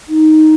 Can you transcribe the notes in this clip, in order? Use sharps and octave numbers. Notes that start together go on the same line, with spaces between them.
D#4